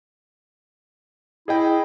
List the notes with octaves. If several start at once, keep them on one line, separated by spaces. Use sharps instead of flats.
E4 G#4 D#5 G5